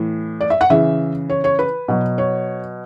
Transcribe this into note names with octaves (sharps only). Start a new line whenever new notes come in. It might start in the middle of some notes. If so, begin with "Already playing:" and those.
Already playing: A2 E3
D5
E5
F#5
C#3 E3 E5
C#5
C#5
B4
B2 F#3
C#5